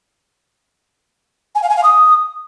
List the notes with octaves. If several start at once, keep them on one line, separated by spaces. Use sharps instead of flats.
G#5
F5
G#5
F5
D#6